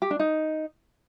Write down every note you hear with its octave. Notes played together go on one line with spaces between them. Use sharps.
G4
D4
D#4